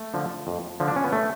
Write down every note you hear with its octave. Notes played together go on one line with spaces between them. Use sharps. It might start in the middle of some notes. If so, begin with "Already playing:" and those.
Already playing: A3
D3 F3
F2
D3 F3
D4
C#4
B3
A3